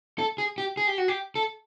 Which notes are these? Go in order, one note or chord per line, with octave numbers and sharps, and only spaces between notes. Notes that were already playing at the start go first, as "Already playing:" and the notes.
A4
G#4
G4
G#4
G4
F#4
G4
A4